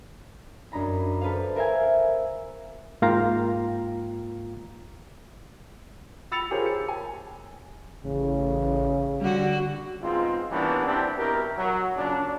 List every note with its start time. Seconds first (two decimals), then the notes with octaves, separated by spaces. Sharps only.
0.72 F#2 D4 D#4 A#5 B5
1.21 A4 B4 C5 F5
1.56 A#4 C5 E5 F5 G#5
3.02 G#2 A#3 F4 F5 G5 A#5
6.32 B5 E6 A6 C#7 F7
6.51 F4 G4 G#4 A#4 C5 C#5
6.66 C#7
6.89 G#5
8.04 A1 C#3
9.21 D3 G3 F#4
10.02 G#2 G#3 B3 C4 F4
10.50 E3 G3 A#3 B3 C#4 D4
10.85 C4 D4 E4 G4
11.17 B2 E4 G4 A#4
11.56 F#3
11.95 A#2 C#3 C#4 D4